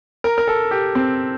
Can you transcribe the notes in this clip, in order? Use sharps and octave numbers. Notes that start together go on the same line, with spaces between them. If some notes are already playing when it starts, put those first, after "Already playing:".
A#4
A#4
A4
G4
C4